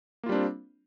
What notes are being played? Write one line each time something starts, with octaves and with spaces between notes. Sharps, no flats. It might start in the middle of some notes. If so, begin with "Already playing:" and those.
G3 A#3 C4 D4 F4